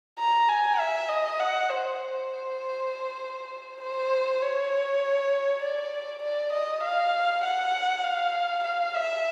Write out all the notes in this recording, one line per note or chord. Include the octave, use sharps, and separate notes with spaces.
A#5
G#5
E5
D#5
F#5
C5
C5
C5
C#5
D5
D5
D#5
F5
F#5
F5
F5
E5